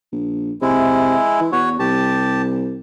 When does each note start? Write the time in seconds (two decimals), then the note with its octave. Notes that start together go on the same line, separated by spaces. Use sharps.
0.12 A#1
0.62 C3 G#3 E4
1.40 E3
1.52 E2 F#4 C#5
1.79 C2 G4 A5